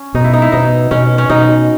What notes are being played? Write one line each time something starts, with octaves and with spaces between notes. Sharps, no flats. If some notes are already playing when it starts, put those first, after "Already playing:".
Already playing: C#4
B2 D#4
E4
D#4
E4
B2 D#4
B2 C#4
C#4
B2 D#4